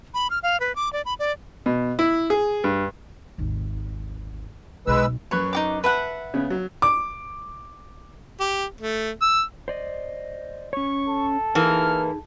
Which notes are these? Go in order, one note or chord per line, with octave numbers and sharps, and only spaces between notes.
B5
F6
F5
B4
D6
D5
B5
D5
B2
E4
G#4
G2
G#1 D#2
B1 G#3 B4 E6
F#2 B4 C#5 C#6
D#4 F#4 D6
B4 E5 F#5 A5 F#6
C#3 B3 C#4
F#3
D6
G4
A3
E6
C5 D5 D#5
C#4 C#5 C#6
A4
E3 A#3 D#4 G#4 F6